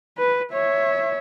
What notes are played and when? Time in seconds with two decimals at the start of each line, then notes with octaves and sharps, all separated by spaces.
0.18 B4
0.53 C#5 E5